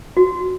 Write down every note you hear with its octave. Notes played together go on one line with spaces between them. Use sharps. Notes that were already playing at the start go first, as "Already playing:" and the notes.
F#4